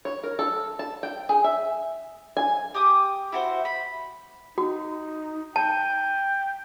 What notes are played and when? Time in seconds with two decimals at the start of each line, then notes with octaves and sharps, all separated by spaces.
0.05 C#5
0.24 A#4
0.39 A4
0.79 A5
1.03 G5
1.29 G#4
1.44 E5
2.37 G#5
2.74 G4 D6 D#6
3.32 E4 F#4 C5
3.65 B5
4.58 D#4 F#4
5.56 G5 A5